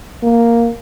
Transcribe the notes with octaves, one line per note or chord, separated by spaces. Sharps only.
A#3